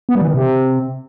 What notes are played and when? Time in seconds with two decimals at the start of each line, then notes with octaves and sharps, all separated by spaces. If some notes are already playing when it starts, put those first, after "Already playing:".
0.09 B3
0.15 G3
0.21 E3
0.28 D#3
0.34 C3